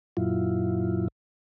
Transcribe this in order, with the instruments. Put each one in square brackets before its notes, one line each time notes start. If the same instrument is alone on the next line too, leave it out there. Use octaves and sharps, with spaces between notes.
[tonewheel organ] F#2 A#2 F#3 E4 F4